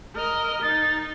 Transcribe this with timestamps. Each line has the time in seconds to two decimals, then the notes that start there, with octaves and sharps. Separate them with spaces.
0.16 A#4 D#5 F6
0.62 D#4 A6